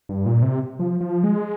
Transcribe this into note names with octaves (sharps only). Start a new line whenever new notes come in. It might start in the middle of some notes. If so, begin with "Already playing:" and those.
G2
A#2
C3
F3
F3
G#3